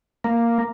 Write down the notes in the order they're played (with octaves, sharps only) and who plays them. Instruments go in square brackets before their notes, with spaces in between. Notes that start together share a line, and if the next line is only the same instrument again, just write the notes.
[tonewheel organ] A#3